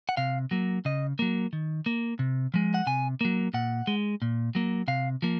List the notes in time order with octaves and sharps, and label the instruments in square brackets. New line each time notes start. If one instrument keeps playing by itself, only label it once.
[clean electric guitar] F#5
C3 F5
F#3 A#3
C#3 D#5
F#3 A#3
D#3
A#3
C3
F3 G#3
F#5
C3 G#5
F#3 A#3
A#2 F#5
G#3
A#2
F#3 A#3
C3 F5
F3 A#3